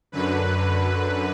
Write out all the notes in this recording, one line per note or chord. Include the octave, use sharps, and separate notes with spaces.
F#2 D3 F#3 B4